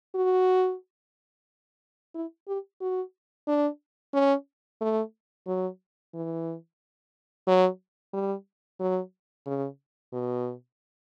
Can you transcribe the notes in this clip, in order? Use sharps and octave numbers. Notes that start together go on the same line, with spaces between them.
F#4
E4
G4
F#4
D4
C#4
A3
F#3
E3
F#3
G3
F#3
C#3
B2